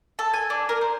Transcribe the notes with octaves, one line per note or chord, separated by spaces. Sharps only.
A4
G#5
D4
A#4
C5